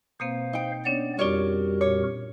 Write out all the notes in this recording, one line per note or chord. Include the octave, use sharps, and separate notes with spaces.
B2 A#3 C4 C5 F5
D#4 G5
B3 C#4 D4 C#5 D5
F2 G3 F4 F#4 A#4 C#5 D5 C#6
A#2 C#5